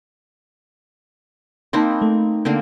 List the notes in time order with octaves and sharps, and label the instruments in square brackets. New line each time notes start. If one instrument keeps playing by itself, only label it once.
[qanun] A#3 C4 D#4 [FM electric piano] A5 B5 C6
[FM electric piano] A3
[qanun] D3 A#3 C4